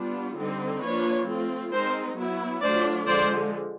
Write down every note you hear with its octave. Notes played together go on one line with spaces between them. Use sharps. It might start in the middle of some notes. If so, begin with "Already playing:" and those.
Already playing: G3 B3 D4 F4
D3 G3 C4 D#4
F3 A#3 D4 F4 B4 C#5
A3 C4 F4
G#3 C4 D#4 A#4 C5
F#3 B3 E4
F#3 A3 D4 F4 C5 D5
D3 F3 G#3 C5 D5